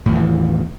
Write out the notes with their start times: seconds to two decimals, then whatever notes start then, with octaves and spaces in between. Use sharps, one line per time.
0.06 A2
0.09 D#3
0.12 E2
0.15 E3